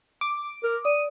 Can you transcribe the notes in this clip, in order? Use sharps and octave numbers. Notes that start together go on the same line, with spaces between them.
D6
A#4
D5 D#6